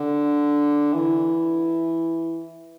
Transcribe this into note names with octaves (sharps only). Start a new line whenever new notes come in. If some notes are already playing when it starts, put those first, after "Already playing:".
Already playing: D3
E3